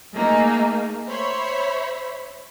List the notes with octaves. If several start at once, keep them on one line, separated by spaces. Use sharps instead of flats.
A3 A#3 D#4 G#4
C5 C#5 E5 B5